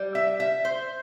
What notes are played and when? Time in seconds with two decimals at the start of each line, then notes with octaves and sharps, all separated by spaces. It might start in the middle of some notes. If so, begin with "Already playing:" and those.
Already playing: G3
0.15 E5
0.40 E5
0.65 C5